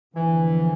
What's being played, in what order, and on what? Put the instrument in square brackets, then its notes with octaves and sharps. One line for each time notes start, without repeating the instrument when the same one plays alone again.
[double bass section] E2 D3 F3 [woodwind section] E3